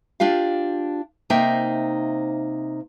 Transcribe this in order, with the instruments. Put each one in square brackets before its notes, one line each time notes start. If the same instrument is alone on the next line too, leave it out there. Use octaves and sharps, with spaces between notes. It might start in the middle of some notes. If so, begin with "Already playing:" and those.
[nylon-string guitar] D4 F4 G4 F5
C3 A#3 D#4 C5 E5 G5